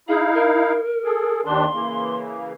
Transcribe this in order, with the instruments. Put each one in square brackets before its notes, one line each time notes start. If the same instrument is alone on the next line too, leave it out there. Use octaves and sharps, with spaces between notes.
[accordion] D#4 E4 F5 [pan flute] G#4
[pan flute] A#4
[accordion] G#4 A4
[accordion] D#2 D#3 D4 [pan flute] C6
[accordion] C#3 E3 A#3